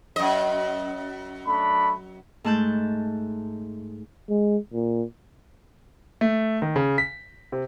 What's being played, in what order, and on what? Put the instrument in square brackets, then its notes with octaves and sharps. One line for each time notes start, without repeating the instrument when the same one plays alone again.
[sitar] F#2 D#5
[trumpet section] A3 D4 B5
[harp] G#2 A3 A5 F#6 G6
[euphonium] G#3
A#2
[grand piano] A3
D#3
C#3
B6
C3